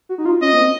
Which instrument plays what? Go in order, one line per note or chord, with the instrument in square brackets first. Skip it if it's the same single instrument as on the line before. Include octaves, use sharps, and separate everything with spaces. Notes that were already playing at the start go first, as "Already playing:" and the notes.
[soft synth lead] F#4
D#4
F4
[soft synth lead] C#4 [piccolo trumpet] D#5
[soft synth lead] A#3
C4